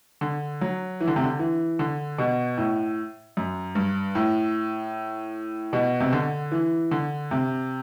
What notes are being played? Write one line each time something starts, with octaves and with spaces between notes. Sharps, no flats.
D3
F#3
E3
D3
C3
D3
E3
D3
B2
A2
F#2
G2
A2
B2
C3
D3
E3
D3
C3